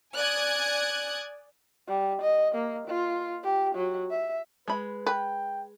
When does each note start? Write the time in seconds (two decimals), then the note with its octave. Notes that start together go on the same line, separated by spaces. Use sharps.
0.15 D5 G#5 D#6 F#6 G#6
1.87 G3
2.21 D#5
2.55 A#3
2.87 F4
3.43 G4
3.75 F#3
4.10 E5
4.68 G#3 B4 B5
5.06 B4 G5